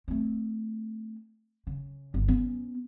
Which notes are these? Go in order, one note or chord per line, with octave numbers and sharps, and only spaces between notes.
A3 C4
C#3
G1 D4
B3 C#4